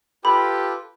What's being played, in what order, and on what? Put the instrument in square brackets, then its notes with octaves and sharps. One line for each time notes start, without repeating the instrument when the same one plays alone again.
[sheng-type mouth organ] F4 A4 B4 [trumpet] G4 [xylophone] B5